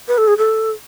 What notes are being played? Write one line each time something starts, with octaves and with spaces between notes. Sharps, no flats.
B4
A4
G#4
A4